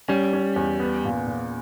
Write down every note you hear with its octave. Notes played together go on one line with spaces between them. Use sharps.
G3 C#4
C#4
E2
B3
A#2
A#2